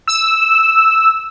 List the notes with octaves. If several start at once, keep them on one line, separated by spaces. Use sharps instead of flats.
E6